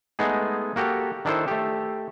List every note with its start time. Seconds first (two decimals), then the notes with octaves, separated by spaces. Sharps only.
0.19 G#3 A3 B3 D#4 G#4
0.76 A#3 F#4 G4 A4
1.25 D#3 D4 E4 A4 C5
1.48 A3 G4